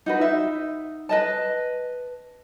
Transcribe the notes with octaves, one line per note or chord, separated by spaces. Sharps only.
D#4 F#4 B4
D#4 E5
B4 D#5 A5